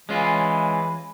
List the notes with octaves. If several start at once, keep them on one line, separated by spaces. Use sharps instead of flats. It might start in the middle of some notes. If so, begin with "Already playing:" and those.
E3 G#3 C#4 F4